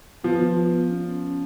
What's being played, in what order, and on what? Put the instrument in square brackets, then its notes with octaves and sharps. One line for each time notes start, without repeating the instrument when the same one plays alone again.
[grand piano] F3 [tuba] B3
[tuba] C#4